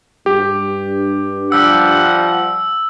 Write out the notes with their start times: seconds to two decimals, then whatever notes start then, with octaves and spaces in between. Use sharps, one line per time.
0.26 G2 G4
1.52 F3 G3 F#5 E6